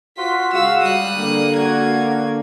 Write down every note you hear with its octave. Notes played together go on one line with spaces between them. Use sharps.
F4 F#4 C6 B6
C#3 G#3 F#4 F5 E6
G3 D#6 F#6
D3 A#3
F#4 G#6